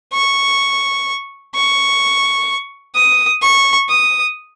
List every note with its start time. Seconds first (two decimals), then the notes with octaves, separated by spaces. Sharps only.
0.13 C#6
1.55 C#6
2.95 D#6
3.42 C#6
3.89 D#6